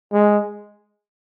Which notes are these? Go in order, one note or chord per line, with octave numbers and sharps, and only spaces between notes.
G#3